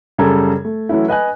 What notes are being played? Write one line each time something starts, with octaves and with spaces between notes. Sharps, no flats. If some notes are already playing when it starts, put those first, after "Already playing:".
F#2 C#3 G3 A4 A#5 G#6
A3
E3 F#3 A3 C#4 E4
B4 D#5 G#5 F#6